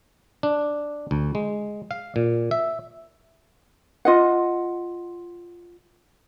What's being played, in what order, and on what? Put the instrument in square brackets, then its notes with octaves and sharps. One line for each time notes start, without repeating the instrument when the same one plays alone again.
[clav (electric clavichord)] D4
D2
G#3
F5
A#2
E5
[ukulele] F4 D#5 F#5